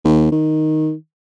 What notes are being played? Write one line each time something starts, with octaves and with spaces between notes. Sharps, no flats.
D#2
D#3